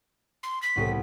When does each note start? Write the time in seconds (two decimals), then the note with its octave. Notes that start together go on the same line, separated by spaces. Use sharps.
0.43 C6
0.62 B6
0.76 C2 A2 B3